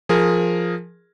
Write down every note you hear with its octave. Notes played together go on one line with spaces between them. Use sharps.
F3 G#4 A#4